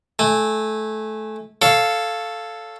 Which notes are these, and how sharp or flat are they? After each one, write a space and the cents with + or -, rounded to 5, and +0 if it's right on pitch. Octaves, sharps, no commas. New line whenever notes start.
A3 -20 G#5 -15
A4 +0 C#5 +0 F5 +0